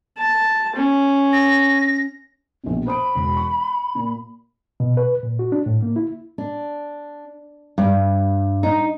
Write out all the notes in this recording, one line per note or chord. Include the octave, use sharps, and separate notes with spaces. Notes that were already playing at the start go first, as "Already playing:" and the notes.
A5
C#4
A#6
A#1 B2
C5 B5 D#6 D7
E1
C#6
A#2
B2
B4
A#2
F#4
D4
A2
A#3
E4
D4
G2
D#4